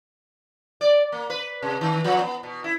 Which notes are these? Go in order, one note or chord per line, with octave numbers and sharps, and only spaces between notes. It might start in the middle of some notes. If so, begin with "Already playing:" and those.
D5
A#3
B4
C3
D#3
F3
B3
B2
E4